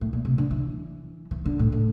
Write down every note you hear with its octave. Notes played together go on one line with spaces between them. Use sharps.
A2
A#2
C3
D3
E3
E3
D3
A2
A2